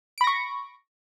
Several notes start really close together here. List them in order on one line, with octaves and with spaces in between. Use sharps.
D7 B5 A#6 C#6